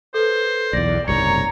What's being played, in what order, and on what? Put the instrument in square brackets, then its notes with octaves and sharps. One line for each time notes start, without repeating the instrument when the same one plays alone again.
[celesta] A4 B4 [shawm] C5
[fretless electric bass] B1 E2 [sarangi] D5 [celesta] A#6
[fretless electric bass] F#1 C2 G#2 [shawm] C#5 [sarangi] A#5 [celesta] C#7